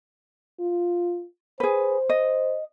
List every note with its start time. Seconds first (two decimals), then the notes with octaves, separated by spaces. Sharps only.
0.60 F4
1.60 G#4 B4 C5
2.09 D#5